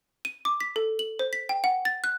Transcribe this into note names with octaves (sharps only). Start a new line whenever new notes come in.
D#7
D6
B6
A4
F#7
C5
B6
G5
F#5
A6
F#6